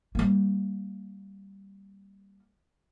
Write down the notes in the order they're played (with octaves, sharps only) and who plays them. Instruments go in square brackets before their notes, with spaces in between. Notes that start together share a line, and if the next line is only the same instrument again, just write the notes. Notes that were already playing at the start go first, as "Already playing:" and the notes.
[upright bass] G3 A#3